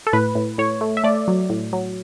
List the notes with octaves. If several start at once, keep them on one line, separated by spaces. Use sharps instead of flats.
A4
A2 B4
A2
A2 C#5
A3
E5
A3 D5
F#3
A2
F#3